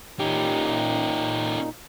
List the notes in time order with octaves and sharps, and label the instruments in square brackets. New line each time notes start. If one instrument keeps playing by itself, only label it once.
[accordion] A#2 D#4 [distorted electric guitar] C#4 G4